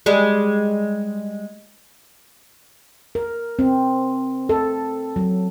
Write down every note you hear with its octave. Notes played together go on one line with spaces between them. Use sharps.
G3 G#3
A#4
C4
A4
F#3